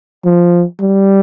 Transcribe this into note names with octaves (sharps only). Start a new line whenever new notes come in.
F3
G3